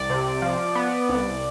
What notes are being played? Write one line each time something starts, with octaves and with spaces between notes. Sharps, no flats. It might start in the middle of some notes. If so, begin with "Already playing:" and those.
Already playing: C2 D5
C3
F3
B3
C2